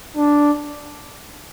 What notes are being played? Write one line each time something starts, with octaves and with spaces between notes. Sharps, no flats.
D4